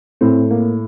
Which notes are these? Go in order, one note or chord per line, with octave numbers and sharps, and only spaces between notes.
A2 C4
A#3